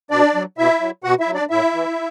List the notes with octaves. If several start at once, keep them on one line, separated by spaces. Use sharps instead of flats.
B2 D4 D5
F#3
B2 E4 E5
F#3
B2 F#4 F#5
E4 E5
F#3
D4 D5
A2 E4 E5
E3